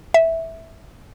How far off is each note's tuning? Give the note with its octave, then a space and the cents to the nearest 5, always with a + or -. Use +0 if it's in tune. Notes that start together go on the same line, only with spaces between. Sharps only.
E5 -10